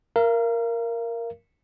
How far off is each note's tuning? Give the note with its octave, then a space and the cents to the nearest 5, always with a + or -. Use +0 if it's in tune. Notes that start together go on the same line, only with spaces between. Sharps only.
A#4 +0 F5 -40